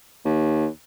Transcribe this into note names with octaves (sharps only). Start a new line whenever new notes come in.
D#2